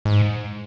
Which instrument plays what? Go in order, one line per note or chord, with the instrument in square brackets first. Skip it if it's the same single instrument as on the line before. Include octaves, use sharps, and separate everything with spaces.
[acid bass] G#2